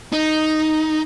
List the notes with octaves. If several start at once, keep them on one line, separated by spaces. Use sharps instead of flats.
D#4